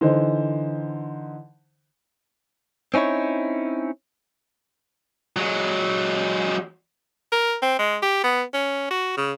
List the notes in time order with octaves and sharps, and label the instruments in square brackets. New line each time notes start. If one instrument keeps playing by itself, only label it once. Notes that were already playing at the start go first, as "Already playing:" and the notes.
[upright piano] D3 E3 D#4 C5
[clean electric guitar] C4 C#4 D#4 E4 C#5
[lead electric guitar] F#3 G#3
[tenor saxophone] A#4
C4
G#3
G4
B3
C#4
F#4
C#3